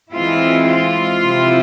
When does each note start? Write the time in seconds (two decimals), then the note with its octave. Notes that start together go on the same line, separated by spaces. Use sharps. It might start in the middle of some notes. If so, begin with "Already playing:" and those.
0.13 E3 G#3 C4 E4 F4
0.68 F4
1.24 C3 F3 C4 E4